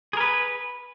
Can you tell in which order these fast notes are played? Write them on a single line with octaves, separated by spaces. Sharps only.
G#4 A#4 B4